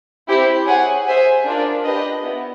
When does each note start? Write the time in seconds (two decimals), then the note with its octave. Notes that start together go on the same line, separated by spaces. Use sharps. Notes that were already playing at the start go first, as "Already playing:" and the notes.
0.28 C4 E4 G4 C5
0.66 G#4 C#5 F#5
1.06 G#4 C5 E5 G#5
1.44 D4 F4 A#4 D5
1.84 D4 G4 B4 D#5
2.24 B3 E4